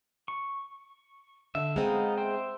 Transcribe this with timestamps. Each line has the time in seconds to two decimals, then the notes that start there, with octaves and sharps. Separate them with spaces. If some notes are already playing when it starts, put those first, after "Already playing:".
0.28 C#6
1.55 D3 E5
1.76 G#3 B3 C4 D#4 F5
2.18 C5 E5 G5